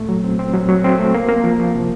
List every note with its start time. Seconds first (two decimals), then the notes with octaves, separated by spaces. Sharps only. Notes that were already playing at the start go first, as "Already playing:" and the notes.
Already playing: A#2 A3
0.09 F#3
0.24 C4
0.39 C4
0.54 F#3
0.69 F#3
0.84 C4
0.99 A3
1.14 A#3
1.29 A#3
1.44 F3
1.59 F3
1.75 C3